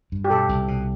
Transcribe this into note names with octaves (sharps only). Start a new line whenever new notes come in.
G2
G4
B2 A4
C2
B2